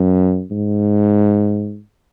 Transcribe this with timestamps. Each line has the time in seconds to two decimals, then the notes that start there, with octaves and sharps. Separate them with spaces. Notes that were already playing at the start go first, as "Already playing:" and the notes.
Already playing: F#2
0.51 G#2